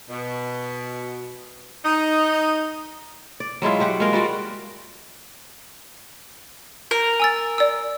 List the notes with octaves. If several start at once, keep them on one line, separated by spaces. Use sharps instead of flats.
B2
D#4
D5
F#3 G#3 E4 F4
F#3 G4 F#5
G#3 A#3 F4 A#4
G3 F4 F#4 D5
A#4
G#5 E6 A6
D5 E6